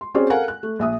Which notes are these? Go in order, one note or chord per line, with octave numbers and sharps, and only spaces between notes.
C6
C4 C#4 F#4 G#4 C5 D5
A4 A#4 F5 F#5 G#5
F#6
A3
A#1 E5 D#6